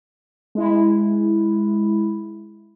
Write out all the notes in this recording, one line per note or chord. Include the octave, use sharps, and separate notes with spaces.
G#3 E4